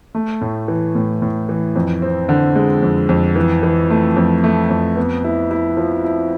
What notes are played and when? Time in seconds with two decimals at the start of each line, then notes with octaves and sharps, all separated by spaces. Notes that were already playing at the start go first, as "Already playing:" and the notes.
0.15 A3
0.41 A2
0.68 E3
0.95 A2
1.22 A2
1.49 E3
1.76 F2
2.02 C4
2.29 D3
2.56 G#3
2.83 F2
3.09 F2
3.36 E3
3.63 E3
3.90 A3
4.16 F2
4.44 A3
4.70 F2
4.97 B3
5.24 E4
5.51 E4
5.77 F3
6.04 E4